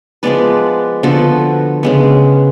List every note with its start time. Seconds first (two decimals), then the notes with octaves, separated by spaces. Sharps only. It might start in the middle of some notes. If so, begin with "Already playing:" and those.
0.23 F3 G#3 B3 B4 D5
1.03 D3 F3 B3 F#4 A4
1.83 C#3 G#3 B3